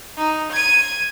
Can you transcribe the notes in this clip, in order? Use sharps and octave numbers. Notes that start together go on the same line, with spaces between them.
D#4
G#6 D#7